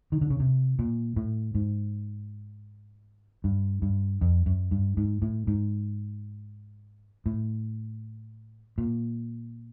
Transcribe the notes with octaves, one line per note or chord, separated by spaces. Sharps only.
D#3
D3
C#3
C3
A#2
A2
G#2
G2
G2
F2
F#2
G2
G#2
A2
G#2
A2
A#2